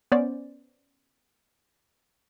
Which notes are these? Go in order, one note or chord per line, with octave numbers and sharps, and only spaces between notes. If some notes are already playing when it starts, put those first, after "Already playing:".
B3 C#4 C5 D5